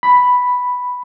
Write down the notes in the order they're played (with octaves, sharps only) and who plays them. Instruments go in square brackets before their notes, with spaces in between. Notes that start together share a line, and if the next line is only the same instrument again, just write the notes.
[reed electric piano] B5